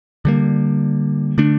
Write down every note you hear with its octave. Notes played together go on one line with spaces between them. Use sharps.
D3 G3 A#3
D3 A3 D4